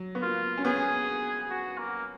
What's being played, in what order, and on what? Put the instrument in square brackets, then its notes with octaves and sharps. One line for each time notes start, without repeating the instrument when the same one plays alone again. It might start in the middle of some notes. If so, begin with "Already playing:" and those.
Already playing: [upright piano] F#3
B3
[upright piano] A#3 [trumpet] F4
[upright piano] C#4
[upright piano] B3 [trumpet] G#4
[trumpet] F#4
A#3